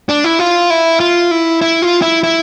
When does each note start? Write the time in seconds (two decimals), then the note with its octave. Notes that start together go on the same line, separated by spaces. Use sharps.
0.09 D4
0.24 E4
0.39 F4
0.70 E4
1.00 F4
1.31 E4
1.62 E4
1.82 F4
2.02 E4
2.23 E4